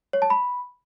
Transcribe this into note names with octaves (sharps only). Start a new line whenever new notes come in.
C#5
A5
B5